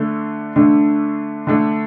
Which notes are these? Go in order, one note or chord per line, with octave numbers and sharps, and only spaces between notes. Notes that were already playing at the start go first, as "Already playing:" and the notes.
Already playing: D3 A3 D4
D3 A3 D4
D3 A3 D4